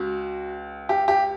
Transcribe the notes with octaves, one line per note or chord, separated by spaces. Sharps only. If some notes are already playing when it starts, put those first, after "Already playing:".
Already playing: C#2 F#4
G4
G4